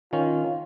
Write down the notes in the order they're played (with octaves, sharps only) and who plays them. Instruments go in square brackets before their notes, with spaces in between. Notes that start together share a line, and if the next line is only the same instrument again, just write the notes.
[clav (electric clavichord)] D#3 C#4 [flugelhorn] F4